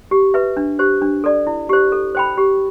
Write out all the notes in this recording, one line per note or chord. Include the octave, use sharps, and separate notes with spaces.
G4
B4 E5
D4
G4 C5
D4
A4 D5
E4
G4 C5
A4
C5 G5 B5
G4